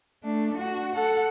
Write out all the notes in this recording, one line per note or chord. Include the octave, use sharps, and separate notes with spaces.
A3 D4
F#4
A4 F#5